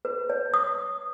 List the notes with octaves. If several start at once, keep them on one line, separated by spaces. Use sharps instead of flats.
B4
C#5
D#6